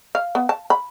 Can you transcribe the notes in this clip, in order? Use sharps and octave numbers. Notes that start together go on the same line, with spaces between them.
F5
B3
A5
B5